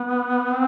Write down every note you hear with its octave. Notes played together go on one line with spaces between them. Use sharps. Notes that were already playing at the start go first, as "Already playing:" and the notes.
Already playing: B3
C4